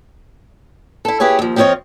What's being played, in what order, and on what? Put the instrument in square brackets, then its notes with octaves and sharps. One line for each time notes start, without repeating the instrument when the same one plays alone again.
[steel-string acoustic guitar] E4 A4
E4 G4 G#4 B4 C#5
D#2 F3
F3 C4 E4 F4 C#5 D#5